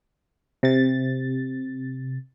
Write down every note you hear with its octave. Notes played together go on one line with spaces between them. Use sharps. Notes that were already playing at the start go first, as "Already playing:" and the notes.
C3 A6